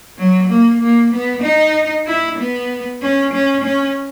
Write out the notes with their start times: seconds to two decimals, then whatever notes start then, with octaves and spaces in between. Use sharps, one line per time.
0.18 F#3
0.50 A#3
0.82 A#3
1.13 B3
1.43 D#4
2.07 E4
2.39 B3
3.02 C#4
3.33 C#4
3.64 C#4